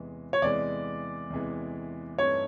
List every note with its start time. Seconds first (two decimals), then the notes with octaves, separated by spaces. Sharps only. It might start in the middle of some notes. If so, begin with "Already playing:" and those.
Already playing: E2 C3 E3 G#3
0.33 C#5
0.42 E2 C3 E3 G#3 D5
1.30 E2 C3 E3 G#3
2.18 G2 E3 A3 C4 D#4 C#5